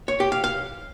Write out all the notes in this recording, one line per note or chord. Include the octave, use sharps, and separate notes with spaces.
C#5
G4
F5
F5